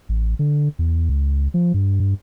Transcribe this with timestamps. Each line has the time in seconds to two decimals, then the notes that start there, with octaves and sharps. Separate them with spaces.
0.09 A1
0.39 D3
0.79 E2
1.09 C#2
1.54 F3
1.74 G2
2.00 G2